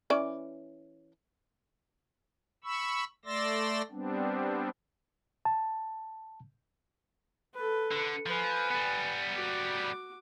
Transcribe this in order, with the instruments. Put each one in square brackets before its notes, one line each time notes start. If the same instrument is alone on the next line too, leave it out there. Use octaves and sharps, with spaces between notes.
[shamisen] E3 C#4 D5
[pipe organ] B5 C#6 E6
A3 D5 C6 E6 A6 A#6
G3 B3 C4 D4
[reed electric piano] A5
[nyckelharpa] A4 B4
[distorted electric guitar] D3
[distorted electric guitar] F3 [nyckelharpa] B4 G#5
[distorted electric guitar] G3 B3
[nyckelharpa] F#4 D6